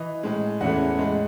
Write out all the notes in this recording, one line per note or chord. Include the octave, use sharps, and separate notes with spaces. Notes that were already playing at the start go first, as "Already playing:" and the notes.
Already playing: E3 D#5
A2 G#3
E2 C#3 E3 A3 F#5
A2 G#3